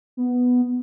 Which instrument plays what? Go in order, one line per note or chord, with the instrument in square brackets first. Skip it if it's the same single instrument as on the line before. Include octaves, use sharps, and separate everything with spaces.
[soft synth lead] B3